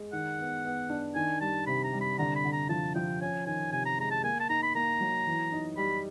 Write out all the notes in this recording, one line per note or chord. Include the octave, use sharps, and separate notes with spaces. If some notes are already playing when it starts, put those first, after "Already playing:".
Already playing: G#3
D#3 F#5
B3
B3
D4
D#3 G#5
G3 A5
C3 B5
A#5
G3
B5
D3 A#5
B5
D3
A#5
F3 A5
F3 G5
C#4 G#5
D#3 G#5
C3 G#5
A#5
G#3 A#5
A5
A#3 G#5
A5
D#4 A#5
B5
A#3 A#5
F#3
E3
D#4
G3 B5